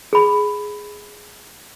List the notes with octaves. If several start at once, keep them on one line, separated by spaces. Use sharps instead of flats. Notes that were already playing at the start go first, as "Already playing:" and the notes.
G#4 B5